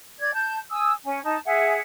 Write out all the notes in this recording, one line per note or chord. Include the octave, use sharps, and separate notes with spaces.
D5 G#6
A5 G6
G#5 D#6 E6
C#4 G#5
D#4 A5
G#4 E5 F#5